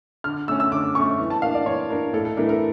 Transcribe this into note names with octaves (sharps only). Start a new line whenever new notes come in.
D3 F6
A3 C#4 E6
E6
D3 D6
A3 C#4 C#6
E3
A5
A#3 D4 F5
D5
E3 C#5
A#3 D4 A#4
A2 A4
A4
E3 A3 D4 A#4
A#4